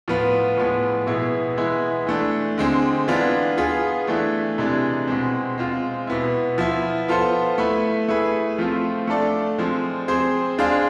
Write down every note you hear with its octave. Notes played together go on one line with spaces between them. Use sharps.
A2 F3 B3 F4 B4
A2 F3 G#3 B3
B2 B3 E4 G#4
E3 G#3 B3 E4
E3 A3 D4
D3 G#3 C4
E3 B3 D4 F4
B3 F4 G#4
E3 A3 D4
C3 E3 G#3 D4
B2 G#3 C4
G#3 C4 F4
B2 B3 E4
F3 B3 E4
B3 F4 A4 C5
A3 E4 B4
A3 E4 G#4 B4
F3 A3 C4 F4
A3 D4 A4 D5 F5
F3 G#3 C4
C4 G#4 C5
G#3 D4 G#4 C5 F5